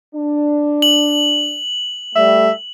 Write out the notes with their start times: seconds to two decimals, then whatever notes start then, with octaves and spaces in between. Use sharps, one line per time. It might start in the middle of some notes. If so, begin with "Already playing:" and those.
0.14 D4
0.82 F#7
2.15 G3 A3 E5